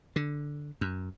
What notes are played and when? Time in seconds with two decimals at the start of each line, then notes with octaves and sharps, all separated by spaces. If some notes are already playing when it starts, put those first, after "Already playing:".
0.16 D3
0.81 F#2